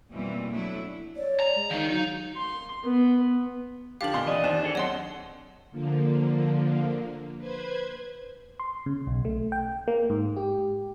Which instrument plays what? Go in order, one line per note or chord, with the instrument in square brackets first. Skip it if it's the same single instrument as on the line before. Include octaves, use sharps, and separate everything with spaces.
[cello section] F2 B2 E3 G3 A#3 C4
F#3 A3 D4 E4
[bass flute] C#5 [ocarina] D5
[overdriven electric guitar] A#5
[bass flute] G#3
[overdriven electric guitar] D#3 D#4 [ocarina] F5
[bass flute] F#3 [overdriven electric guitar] D#4
[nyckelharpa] C6
B3
[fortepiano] D3 F3 G4 [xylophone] F5 F#7
[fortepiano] F2 A#2 C6
[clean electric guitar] E3 D#5 G#5 [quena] D5
[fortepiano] D#2 [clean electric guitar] C5
[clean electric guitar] D4 G#4 A4
[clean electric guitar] F#3 C4 C6 [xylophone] C#5 D#5 A5 [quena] F#5
[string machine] D3 F3 A#3
B4 C5 G#6
[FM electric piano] C6
C#3
B1
A3
G5
A#3
G#2
G4